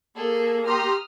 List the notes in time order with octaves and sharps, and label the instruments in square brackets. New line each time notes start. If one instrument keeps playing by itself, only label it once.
[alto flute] A#3 [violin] G#4 A4
[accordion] G4 A#5 C6 [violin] D#6 F6